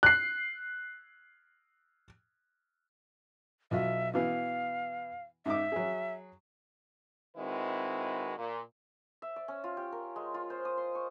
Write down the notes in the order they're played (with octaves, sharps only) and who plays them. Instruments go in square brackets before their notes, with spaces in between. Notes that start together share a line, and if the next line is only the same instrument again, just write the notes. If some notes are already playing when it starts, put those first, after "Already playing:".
[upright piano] F#6 C7
[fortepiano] B1 F4 F#4 [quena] E5
[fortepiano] B2 E3 B3 [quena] F5
[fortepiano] G#2 D#4 D6 [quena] E5
[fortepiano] F#3 G#4
[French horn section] D#3 G#3 C4 E4 F#4 B4
A#2
[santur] E5
D5
C#4
F4
G4
A#4
G#3
F4
C5
D#6
C6
C#6